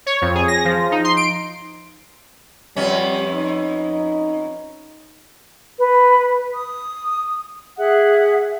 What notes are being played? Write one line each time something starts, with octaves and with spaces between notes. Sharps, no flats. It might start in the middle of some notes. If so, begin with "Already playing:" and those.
C#5
F2
G#4
A#6
F3
D#4
C6
D7
F2 G3 B3 C#4
D#4
B4
D#6
G#4 E5 F#5